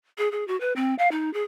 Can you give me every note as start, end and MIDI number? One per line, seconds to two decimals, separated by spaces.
0.18 0.31 68
0.32 0.46 68
0.48 0.59 66
0.61 0.73 71
0.76 0.95 60
0.99 1.09 77
1.11 1.32 63
1.34 1.43 68